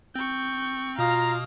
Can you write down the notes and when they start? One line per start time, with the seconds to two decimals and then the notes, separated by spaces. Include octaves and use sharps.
0.15 C4 C#6 G6
0.99 B2 F4 F5 A#5 D#6